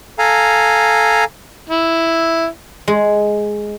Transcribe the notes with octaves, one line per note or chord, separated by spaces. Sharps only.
A4 F5 G#5 A#5
E4
G#3